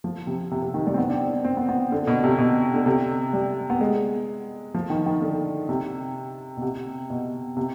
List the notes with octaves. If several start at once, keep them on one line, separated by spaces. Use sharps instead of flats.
F3
C3
C3
C3
D#3
G3
C4
B3
D4
C4
D4
C4
B3
B3
D3
B2
C3
B2
D3
C3
G3
B3
G#3
F3
D#3
D#3
D3
C3
B2
C3
B2
C3